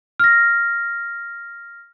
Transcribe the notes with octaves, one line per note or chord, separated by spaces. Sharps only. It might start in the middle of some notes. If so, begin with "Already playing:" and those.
F6 A#6